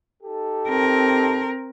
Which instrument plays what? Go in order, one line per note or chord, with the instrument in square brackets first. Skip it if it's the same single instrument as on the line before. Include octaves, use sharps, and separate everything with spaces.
[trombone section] D#4 G4 A4
[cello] C4 A#4